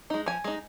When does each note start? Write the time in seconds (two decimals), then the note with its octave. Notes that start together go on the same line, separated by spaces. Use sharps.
0.10 G#3 D#4
0.26 F3 G#5
0.44 G#3 D#4